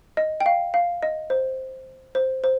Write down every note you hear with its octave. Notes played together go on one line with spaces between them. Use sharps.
D#5
G5
F5
F5
D#5
C5
C5
C5